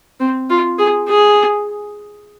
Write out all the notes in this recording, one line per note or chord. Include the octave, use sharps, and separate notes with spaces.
C4
F4
G#4
G#4